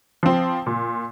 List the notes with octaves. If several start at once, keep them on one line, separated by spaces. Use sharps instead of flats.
F3 C4
A#2